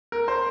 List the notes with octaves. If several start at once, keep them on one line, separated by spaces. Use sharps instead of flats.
A#4
C5